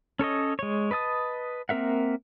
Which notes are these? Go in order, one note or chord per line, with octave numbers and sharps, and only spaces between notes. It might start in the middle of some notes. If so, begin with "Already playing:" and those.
C#4 A4 C#5 D#5
G#3 C#5
B4 D#5 A5 D#6
A#3 C4 A#4 E5 F#5